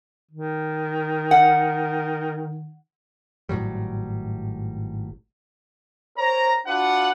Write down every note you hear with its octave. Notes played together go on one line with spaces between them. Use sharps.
D#3
F#5
G#1 A2 F#3 G3
A#4 C5 C#5 A#5
D4 F4 F#4 B4 F5 F#5